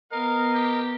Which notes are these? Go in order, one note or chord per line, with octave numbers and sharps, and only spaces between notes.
B3 A#4 D#5 F5
G4